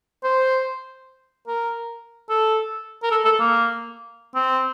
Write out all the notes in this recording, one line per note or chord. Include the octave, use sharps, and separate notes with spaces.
C5
A#4
A4
A#4
A4
A4
A#3
C4